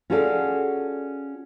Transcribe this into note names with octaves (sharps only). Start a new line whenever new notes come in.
C#4 F4 F#4 G#4 A4 D5